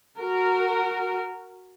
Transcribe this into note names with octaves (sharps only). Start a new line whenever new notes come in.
F#4 A#4